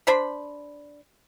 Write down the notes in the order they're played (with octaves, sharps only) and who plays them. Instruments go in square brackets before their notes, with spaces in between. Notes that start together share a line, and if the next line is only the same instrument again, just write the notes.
[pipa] D4 C5 B5